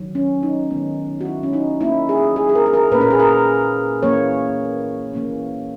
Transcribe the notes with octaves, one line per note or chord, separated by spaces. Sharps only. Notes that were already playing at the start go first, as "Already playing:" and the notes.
Already playing: D#3 F#3
C#4
D#4
D#3 G#3 B3
F#4
E4
C#4
D#4
E3 A#3 C#4 E4
G#4
G#4
G#4
A#4
G#4
A#4
A#2 A#3 C#4 B4
A#4
G#4
A#4
E3 A#3 C#4 C#5
E3 A#3 C#4